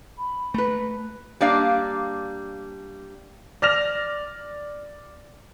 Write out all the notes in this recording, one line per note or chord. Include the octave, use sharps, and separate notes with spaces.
B5
A3 B4 A#5
G3 A#3 D4 D5 D#5 F5
D5 F6 A#6 F7